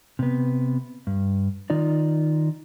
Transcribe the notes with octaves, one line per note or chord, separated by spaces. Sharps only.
C3 B3
G2
D#3 D#4 F4 D5